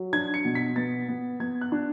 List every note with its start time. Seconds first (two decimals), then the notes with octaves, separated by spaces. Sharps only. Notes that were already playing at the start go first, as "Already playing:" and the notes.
Already playing: F#3
0.13 D4 G#6
0.34 C#7
0.45 B2
0.55 B6
0.76 B3 A6
1.08 B3
1.40 B3 G#6
1.61 F#6
1.72 D4